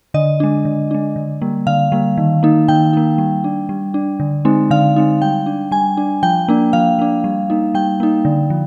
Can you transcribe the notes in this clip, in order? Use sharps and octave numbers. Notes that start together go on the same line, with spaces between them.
D3 D#5
G#3 D4
D3
G#3 D4
D3
G3 A#3
D3 F5
G3 A#3
D#3
A#3 D#4
D#3 G5
A#3 D#4
G3
D4
G3
D4
D3
G#3 C4 D#4
D3 F5
G#3 C4 D#4
G3 G5
D4
G3 G#5
D4
F3 G5
A#3 D4
F3 F5
A#3 D4
G3
A#3 D#4
G3 G5
A#3 D#4
D3
F3